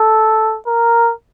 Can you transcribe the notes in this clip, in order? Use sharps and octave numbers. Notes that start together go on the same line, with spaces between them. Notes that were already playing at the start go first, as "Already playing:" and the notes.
Already playing: A4
A#4